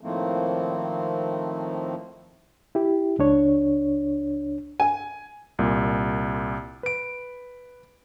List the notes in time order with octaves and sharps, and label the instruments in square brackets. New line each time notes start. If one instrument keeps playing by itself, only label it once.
[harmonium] A2 D#3 F3 A3 A#3 C4
[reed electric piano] E4 G4
C#2 D4 C#5
[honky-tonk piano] G#5
[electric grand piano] C2 A#2
B4 D7